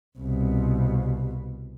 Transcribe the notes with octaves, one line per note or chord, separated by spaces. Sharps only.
C2 B2